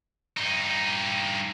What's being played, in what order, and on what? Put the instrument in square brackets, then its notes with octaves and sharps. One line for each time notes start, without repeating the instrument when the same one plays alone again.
[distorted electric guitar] G2 D#4